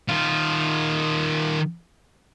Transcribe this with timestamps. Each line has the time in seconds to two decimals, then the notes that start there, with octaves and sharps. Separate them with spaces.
0.09 D#3 F4